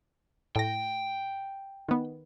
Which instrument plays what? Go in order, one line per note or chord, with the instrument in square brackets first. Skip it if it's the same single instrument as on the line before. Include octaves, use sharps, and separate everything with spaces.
[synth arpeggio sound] A2 A#6 [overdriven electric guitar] G5
[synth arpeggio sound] D#3 B3